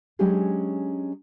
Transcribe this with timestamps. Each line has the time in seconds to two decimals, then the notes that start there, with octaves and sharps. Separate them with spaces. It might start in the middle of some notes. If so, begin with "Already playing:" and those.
0.19 F#3 G#3 C#4 D4 G4 G#4